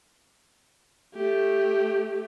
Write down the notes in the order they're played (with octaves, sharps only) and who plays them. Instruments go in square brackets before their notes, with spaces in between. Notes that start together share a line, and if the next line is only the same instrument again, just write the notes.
[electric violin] A3 G4